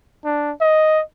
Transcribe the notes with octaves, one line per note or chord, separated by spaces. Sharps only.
D4
D#5